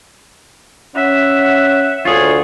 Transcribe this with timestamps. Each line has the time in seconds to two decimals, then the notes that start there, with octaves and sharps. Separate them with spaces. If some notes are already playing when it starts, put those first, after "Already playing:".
0.96 C#4 E5 F#5
1.44 F#5
2.05 D2 F4 G#4 C#5